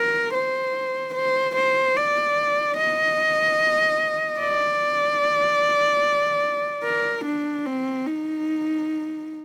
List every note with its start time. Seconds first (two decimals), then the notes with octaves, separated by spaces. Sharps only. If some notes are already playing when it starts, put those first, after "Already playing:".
Already playing: A#4
0.34 C5
1.15 C5
1.56 C5
1.97 D5
2.78 D#5
4.40 D5
6.84 A#4
7.25 D4
7.66 C4
8.06 D#4